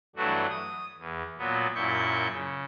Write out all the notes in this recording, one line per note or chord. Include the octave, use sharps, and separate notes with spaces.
G2 E3 F#3 A3 D4 F#4
D#6
E2
A#2 F#3 B3
F#2 A#2 E4 C#6 G6
C#3